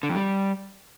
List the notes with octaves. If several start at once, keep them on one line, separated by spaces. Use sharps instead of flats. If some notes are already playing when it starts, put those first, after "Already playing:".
D3
F2
G3